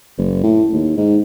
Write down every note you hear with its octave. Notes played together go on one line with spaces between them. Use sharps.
F#1
A2
D#2
G#2